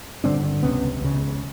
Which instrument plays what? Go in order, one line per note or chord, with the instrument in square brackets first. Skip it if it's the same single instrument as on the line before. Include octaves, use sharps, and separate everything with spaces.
[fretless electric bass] G1 G2 D3 C4 D4
C#2 C3 B3 C#4
C#2 C#3